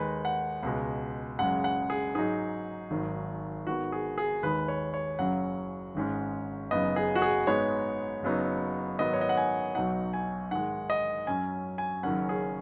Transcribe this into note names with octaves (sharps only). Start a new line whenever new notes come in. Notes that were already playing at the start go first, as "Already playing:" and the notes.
Already playing: D#2 D#3 G#3 D#4 B4
F#5
C#2 B2 G#3
F#1 F#2 C#3 G#3 F#5
F#5
G#4
G#2 F#3 D#4 G#4
G#1 G#2 D#3 F#3
G#2 D#3 B3 F#4
G#4
G#4
D#2 D#3 G#3 B4
C#5
C#5
F#1 F#2 C#3 F#3 C#4 F#5
G#1 G#2 G#3 C#4
F#1 F#2 C#3 B3 D#4 D#5
G#4
F#4
G#4
G#2 G#3 B3 D#4 C#5
F#1 F#2 F#3 B3 D#4
G#2 D#3 F#3 B3 D#5
C#5
D#5
F#5
G#5
B1 B2 F#3 D#4 F#5
G#5
G#2 D#3 G#3 F#5
D#5
F#2 F#3 C#4 G#5
G#5
F#1 F#2 D#3 F#3 C#4 F#5
G#4